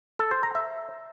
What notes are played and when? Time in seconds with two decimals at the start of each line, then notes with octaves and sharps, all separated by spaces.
0.19 A4
0.31 C5
0.43 A#5
0.55 E5